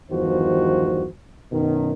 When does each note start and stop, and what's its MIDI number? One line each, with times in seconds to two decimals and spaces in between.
0.11 1.06 40
0.11 1.06 43
0.11 1.06 51
0.11 1.06 53
0.11 1.06 66
0.11 1.06 72
1.52 1.93 42
1.52 1.93 47
1.52 1.93 51